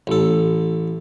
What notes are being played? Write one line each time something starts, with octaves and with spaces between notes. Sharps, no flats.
A1 A4